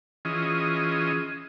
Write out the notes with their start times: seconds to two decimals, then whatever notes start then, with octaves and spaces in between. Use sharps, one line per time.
0.25 E3 C#4 F4 G#4 D#5